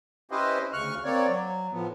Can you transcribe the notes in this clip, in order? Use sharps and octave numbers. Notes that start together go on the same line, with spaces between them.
C#4 E4 G4 B4 C5 D#5
D2 C#3 C#6 F6 F#6
A#3 C4 C#5 D5
F#3
A2 F3 B3